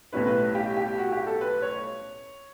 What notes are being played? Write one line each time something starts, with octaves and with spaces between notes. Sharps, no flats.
B1 A2 G3 C#4 E4 B4
B4
G4
G4
F#4
G4
A4
B4
C#5